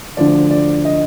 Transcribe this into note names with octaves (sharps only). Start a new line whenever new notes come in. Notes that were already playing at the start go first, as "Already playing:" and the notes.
D2 D3 F3 D5
D5
D#5